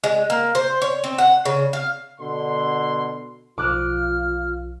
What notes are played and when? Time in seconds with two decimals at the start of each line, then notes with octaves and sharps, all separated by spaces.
0.04 G#3
0.30 A#3
0.55 C5
0.82 C#5
1.04 C4
1.18 F#5
1.45 C#3
1.73 F5
2.20 B2 D3 C6
3.58 B1 F3 F4 D6 F6 F#6